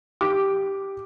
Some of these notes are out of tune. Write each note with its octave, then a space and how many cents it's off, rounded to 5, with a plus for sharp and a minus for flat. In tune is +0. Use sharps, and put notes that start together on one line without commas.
G4 +0 D6 +0